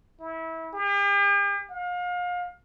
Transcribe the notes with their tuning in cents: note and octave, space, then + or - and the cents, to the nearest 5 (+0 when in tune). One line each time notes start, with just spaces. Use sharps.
E4 -25
G4 +45
F5 +35